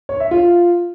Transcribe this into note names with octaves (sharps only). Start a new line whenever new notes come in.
C#5
E5
F4